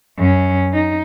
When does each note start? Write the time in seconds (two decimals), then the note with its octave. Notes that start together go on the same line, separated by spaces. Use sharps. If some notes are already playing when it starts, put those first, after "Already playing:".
0.18 F#2 C#4
0.73 D#4